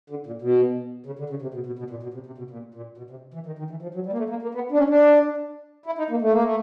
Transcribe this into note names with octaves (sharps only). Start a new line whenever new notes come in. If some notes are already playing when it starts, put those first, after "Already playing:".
D3
A#2
B2
C#3
D3
C#3
C3
B2
B2
B2
A#2
B2
C3
C3
B2
A#2
A#2
B2
C3
E3
D#3
D#3
E3
F3
F#3
G3
A#3
A3
A#3
A#3
B3
D4
C#4
D4
E4
D#4
A#3
A3
A#3
A3